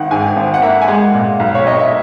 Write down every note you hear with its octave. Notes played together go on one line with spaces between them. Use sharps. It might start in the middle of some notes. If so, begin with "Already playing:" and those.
Already playing: G#1 D#3 F#5
G#2 G#5
G#1
F#5
A#3 E5
G#5
G#3 F#5
A#2
B1
C#5
B1 D#5
E5